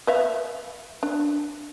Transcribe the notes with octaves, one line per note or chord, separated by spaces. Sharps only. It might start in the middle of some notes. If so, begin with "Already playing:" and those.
B4 E5 F5
D4